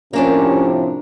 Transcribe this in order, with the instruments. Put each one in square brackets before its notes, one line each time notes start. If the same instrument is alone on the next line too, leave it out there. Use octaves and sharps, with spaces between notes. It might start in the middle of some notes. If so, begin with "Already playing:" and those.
[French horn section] A2 C3 F3 [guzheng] A#3 D4 D5 [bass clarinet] C#4